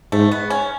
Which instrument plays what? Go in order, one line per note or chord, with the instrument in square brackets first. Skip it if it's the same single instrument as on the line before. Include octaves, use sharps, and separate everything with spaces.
[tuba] G#2 [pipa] A3
[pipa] B3
C#4